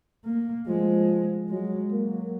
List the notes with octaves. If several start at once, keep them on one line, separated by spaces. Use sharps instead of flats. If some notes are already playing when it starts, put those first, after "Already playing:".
A#3
F3 G#3
F#3 G#3
F#3 A#3